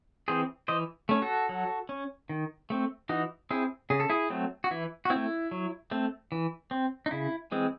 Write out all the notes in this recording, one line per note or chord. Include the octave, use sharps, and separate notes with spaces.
E3 C4 G#4 C5
E3 C5 D#5
A3 C#4
F#4 A4
F#3
C#4
D#3
A3 C4
E3 D#4 F#4
C4 E4 G#4
C#3 G#4
A4
E4 G#4
F#3 A3 C4
F#4
E3 E4
F#4
C4 E4
A3
F#3
A3 C4
E3
C4
D#4
C#3 E4
E3 G#3 C4